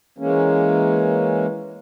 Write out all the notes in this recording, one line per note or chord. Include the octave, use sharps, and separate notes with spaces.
E3 G#3 A#3 C#4